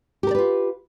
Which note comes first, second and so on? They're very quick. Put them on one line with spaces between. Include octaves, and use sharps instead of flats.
G4 A#4 D5 B4 F4